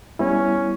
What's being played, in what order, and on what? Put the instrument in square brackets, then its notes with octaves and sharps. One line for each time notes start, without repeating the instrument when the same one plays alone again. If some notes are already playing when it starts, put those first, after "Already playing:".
[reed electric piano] G3 B3 E4 [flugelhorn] C#4